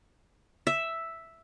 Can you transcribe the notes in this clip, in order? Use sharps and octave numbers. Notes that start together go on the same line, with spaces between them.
E5